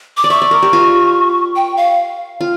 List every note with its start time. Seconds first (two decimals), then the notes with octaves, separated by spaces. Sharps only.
0.17 D6
0.24 D5
0.30 E5 C#6
0.42 D5
0.51 A#4
0.62 G4
0.73 F4
1.56 G5
1.77 F5
2.41 F4